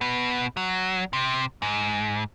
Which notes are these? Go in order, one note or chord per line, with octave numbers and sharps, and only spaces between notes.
B2 B3
F#3
C3
G#2